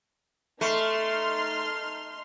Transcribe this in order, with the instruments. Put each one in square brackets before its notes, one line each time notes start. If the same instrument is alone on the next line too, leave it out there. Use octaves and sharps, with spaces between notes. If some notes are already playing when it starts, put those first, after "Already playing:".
[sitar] A3 [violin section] D#4 C6 F6